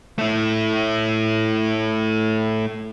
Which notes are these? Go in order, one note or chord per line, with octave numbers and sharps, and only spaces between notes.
A3 E4